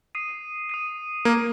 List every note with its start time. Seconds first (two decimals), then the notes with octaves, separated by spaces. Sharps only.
0.15 D#6 C7 D#7
0.69 D#6 C7 D#7
1.25 A#3 G#6 D#7